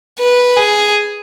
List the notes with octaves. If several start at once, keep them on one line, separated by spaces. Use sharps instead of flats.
B4
G#4